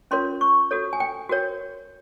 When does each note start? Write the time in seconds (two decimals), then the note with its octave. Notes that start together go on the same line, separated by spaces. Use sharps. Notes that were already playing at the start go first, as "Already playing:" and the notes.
0.11 C#4 F4 A#4 C#5 C6
0.41 C#6
0.71 F#4 A4 C#5
0.93 G#5
1.00 G5
1.29 F#4 A#4 C#5